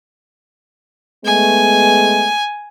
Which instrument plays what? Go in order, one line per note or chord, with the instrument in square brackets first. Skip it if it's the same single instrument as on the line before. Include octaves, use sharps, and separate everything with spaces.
[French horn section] G#3 A3 B3 [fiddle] G#5